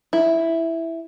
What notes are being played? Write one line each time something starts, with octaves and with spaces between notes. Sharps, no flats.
E4